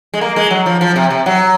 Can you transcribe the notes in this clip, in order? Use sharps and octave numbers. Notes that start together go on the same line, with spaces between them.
G#3
A#3
G#3
F#3
F3
F3
C3
C3
F#3